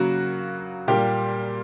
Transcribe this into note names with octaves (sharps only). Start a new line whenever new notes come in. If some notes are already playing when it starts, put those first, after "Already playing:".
Already playing: C#3 F#3 A#3 F#4
A#2 G3 A#3 G4